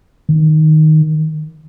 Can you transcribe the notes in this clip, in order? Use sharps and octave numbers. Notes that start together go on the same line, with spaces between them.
D#3